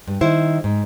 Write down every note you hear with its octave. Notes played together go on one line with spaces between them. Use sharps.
G2
D#3 E4 C5
G#2